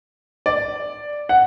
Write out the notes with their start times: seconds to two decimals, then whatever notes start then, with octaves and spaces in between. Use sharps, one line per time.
0.46 D5
1.29 F#5